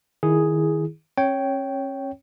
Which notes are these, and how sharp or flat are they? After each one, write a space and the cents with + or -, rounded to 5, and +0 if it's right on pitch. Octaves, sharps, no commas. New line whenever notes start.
D#3 +0 E4 +0 G#4 +0
C#4 -35 C#5 +0 G5 -10